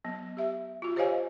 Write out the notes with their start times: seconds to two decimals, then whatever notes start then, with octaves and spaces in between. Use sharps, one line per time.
0.04 F#3 B3
0.37 G4 E5
0.82 F4 F#4
0.96 G4 C5 C#5 D#5 F5 G#5